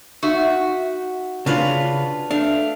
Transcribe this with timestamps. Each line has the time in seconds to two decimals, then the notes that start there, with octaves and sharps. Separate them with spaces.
0.23 D#4 F#4 E5
1.46 C#3 D4 F4 B4 F5
2.31 A3 D4 F5